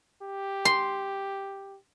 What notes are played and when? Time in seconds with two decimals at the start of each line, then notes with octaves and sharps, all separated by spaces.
0.22 G4
0.65 C6